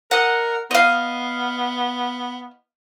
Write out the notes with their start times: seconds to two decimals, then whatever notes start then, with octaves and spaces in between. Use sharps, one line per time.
0.11 A#4 D#5 F#5
0.71 B3 D#5 F5